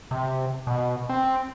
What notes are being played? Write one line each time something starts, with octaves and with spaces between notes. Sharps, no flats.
C3
B2
C4